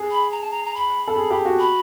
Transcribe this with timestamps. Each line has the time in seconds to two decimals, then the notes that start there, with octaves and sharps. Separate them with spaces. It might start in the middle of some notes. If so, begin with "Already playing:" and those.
Already playing: G#4
0.11 B5
0.32 A#5
0.41 A5
0.51 A#5
0.65 A#5
0.74 B5
1.08 A4
1.16 G#4
1.30 G4
1.45 F#4
1.59 B5